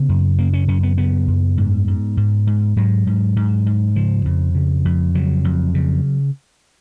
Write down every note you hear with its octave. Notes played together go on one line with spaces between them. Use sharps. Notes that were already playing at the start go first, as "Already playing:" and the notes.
Already playing: C#3 B3
F#2
C#3 A#3
C#4
F#2 C#4
B3
C#3 B3
F#2
G#2
G#2
G#2
G#2
G#2 F#3
G#2
G#2
G#2
C#3 F3
F2
C#3
F2
C#3 F#3
F2
C#3